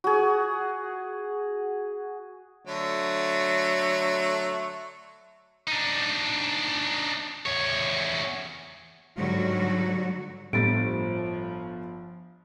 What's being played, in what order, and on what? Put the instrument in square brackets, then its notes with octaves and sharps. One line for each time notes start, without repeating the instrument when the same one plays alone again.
[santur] F#4 G#4
[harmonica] D3 F#3 A3
[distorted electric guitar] D4 D#4
E2 C#5
[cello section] G#2 D3 F#3 G3 F#4
[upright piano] G1 A6 [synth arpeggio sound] A2 G3 [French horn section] F3 [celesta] D7